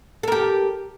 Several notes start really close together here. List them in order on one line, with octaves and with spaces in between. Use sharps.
A4 A#4 G4